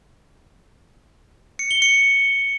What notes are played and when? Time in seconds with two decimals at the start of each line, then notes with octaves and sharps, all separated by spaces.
1.59 C#7
1.71 G7
1.82 C#7